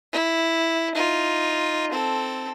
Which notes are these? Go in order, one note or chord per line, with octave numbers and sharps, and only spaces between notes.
E4
D#4 F4
C4 A4